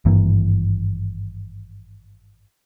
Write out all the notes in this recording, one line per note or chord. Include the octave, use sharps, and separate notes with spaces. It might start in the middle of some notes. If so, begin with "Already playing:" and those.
G#1 G2 E3 A#3